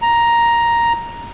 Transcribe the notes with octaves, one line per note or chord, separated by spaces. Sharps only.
A#5